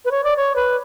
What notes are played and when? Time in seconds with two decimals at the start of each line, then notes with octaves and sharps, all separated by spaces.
0.05 B4
0.11 C#5
0.24 D5
0.37 C#5
0.56 B4